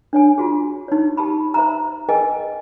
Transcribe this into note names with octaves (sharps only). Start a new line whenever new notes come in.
D4 C#5 G#5
F4 F#4 G#4
D#4 C#5
G4 A5 B5
C5 E5 A#5
G#4 A#4 B4 D#5 G5 G#5